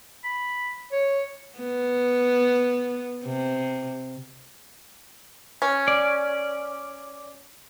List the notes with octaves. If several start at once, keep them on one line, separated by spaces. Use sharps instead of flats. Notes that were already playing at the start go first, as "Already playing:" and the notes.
B5
C#5
B3
C3
C#4
D5